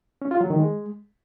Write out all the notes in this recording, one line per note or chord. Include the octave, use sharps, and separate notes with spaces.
C#4
F4
F#3
D#3
G#3